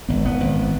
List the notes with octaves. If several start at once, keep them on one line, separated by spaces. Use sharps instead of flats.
G#1 B3
G#1 B3
G#1